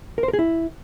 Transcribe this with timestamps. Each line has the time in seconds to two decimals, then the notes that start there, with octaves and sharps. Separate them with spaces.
0.18 A#4
0.23 C5
0.28 A#4
0.33 G#4
0.39 E4